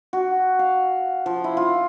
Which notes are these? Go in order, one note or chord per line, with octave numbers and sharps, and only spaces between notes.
F#4
F5
F3
E4
F4